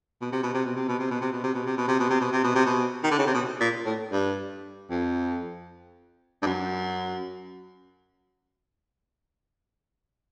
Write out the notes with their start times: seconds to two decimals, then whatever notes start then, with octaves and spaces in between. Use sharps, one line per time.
0.22 B2
0.32 C3
0.43 B2
0.54 C3
0.65 B2
0.76 C3
0.88 B2
0.99 C3
1.11 B2
1.21 C3
1.32 B2
1.43 C3
1.54 B2
1.66 C3
1.77 B2
1.88 C3
2.00 B2
2.10 C3
2.21 B2
2.32 C3
2.44 B2
2.55 C3
2.66 B2
3.04 D#3
3.11 D3
3.19 C#3
3.27 C3
3.34 B2
3.60 A#2
3.85 A2
4.12 G2
4.90 F2
6.42 G2
6.46 F#2